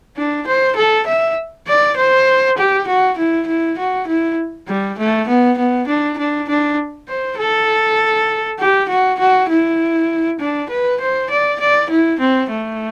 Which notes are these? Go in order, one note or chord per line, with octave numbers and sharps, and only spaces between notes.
D4
C5
A4
E5
D5
C5
G4
F#4
E4
E4
F#4
E4
G3
A3
B3
B3
D4
D4
D4
C5
A4
G4
F#4
F#4
E4
D4
B4
C5
D5
D5
E4
C4
A3